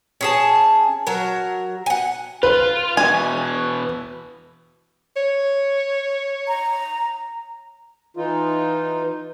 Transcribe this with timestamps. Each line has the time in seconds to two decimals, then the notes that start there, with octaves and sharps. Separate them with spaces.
0.21 C#4 G#4 A5
1.07 F#3 A#4
1.86 F#5 G#5
2.43 F4 B4
2.97 B2 E3 G#5
5.16 C#5
6.48 A#5
8.17 E3 D#4 F4